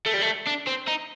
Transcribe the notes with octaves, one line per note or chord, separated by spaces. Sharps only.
A3
G3
A3
D4
C4
D#4